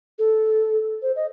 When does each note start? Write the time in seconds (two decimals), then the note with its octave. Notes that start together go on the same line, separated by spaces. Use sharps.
0.19 A4
1.02 C5
1.16 D#5